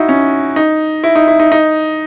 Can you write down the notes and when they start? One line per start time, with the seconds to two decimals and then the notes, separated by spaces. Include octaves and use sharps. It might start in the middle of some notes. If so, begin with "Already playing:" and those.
Already playing: D#4 E4 F#4
0.09 C#4
0.56 D#4
1.04 E4
1.15 D#4
1.28 E4
1.40 D#4
1.52 D#4